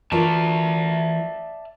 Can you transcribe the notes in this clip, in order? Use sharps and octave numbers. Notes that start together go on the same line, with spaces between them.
E3 F4 A#4 D5 E5 A5